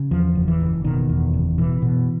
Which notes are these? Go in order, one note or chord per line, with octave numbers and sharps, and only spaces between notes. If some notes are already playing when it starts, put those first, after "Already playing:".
Already playing: C#3
E2 F3
F#1
E3
F#1
B2 D#3
E2
F#1
B2 E3
B2